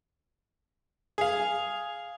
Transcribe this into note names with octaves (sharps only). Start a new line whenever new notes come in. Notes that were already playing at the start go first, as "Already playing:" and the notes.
G#4 F5